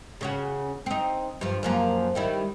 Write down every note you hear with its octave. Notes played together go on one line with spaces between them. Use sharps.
C#3 C#4 F#4
C4 D#4
G2 F3
F#2 F3 A#3
D#3 G3 E4